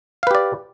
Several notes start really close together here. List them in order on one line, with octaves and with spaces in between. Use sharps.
F5 B4 G4 D5